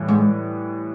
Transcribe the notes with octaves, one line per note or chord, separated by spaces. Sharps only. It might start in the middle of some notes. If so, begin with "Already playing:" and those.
Already playing: A2 E3 G3
G#2